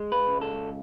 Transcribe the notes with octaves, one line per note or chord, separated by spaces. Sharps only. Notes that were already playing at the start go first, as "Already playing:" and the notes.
Already playing: G#3
B4
C#2
A4